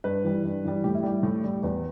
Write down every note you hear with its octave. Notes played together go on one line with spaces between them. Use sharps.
G2 B4
E3 G3
G2
E3 G3
A2 G4
E4
G3 G4
A2
G3
E2 B4